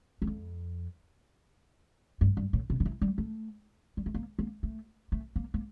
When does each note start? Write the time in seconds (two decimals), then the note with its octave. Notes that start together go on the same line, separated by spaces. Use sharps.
0.22 E2
0.27 F2
2.21 G2
2.37 G2
2.53 A2
2.70 C3
2.80 D3
2.85 E3
3.01 G3
3.18 A3
3.97 G3
4.06 A3
4.14 A#3
4.39 A#3
4.63 A3
5.12 A3
5.36 A#3
5.54 A#3